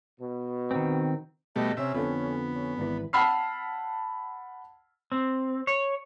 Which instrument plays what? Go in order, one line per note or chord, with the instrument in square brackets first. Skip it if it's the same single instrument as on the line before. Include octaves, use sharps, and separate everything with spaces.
[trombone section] B2
[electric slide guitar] D#3 C4
[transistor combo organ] B2 G3 A3 [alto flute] D#5
[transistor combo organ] C3 E5 [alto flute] C#4
[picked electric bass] F2 D3 [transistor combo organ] B3
[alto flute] C#4
[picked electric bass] G#1 E3 [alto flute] D5
[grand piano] F#5 A5 B5 E6 F6 C7
[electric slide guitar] C4
C#5